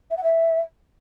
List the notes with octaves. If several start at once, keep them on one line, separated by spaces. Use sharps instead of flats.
E5
F#5
E5